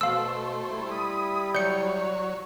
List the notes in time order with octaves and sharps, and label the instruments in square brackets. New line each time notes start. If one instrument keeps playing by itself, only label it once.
[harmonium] B2 [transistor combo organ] A3 C5 [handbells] F5 E6
[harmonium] G3 E4
[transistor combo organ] B5 D#6
[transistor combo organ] F#3 C#5 [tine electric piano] D5 [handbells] G6 C#7